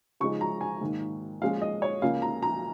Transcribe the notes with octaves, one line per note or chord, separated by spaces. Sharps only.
C#3 F3 G#3 D#4 C#6
A#5
G#5
G#2 D#3 A#3
A#2 F3 G#3 C#4 F5
D#5
C#5
C#2 C#3 A#3 C#4 F5
A#5
A#5